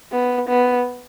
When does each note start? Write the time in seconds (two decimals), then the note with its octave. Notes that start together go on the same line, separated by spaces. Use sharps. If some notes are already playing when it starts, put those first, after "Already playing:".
0.12 B3
0.49 B3